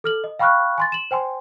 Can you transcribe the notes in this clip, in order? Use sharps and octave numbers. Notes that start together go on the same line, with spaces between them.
A4 F6 F#7
D#5
F5 G5 B5 C#6 F6 F#6
G#5 C6 A6
E7 F#7
C5 G5 G#5 C6